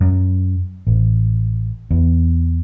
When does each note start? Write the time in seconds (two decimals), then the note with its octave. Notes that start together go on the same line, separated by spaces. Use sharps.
0.01 F#2
0.87 A1
1.91 E2